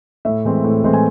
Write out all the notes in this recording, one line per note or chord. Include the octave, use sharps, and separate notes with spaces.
A2 E5
E3 G#3 C4
A2
E3 G#3 C4
G#5